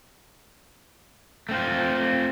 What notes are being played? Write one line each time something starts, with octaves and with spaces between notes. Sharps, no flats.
A3 C4 F4